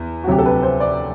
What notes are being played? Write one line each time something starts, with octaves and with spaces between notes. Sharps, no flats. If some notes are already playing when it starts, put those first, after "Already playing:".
Already playing: E2
F#4
D2 C3 F#3 G4
A4
B4
C5
D5